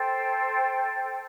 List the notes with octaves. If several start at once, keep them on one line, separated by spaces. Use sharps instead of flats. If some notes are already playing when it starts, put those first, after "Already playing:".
Already playing: A4 C5 G5